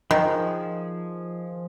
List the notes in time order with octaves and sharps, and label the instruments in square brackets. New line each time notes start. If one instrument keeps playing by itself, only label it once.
[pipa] D#3 [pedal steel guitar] F3 G#4